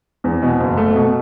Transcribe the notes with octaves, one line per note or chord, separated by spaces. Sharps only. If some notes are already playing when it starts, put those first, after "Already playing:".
E2
B2
F#1
A3
B2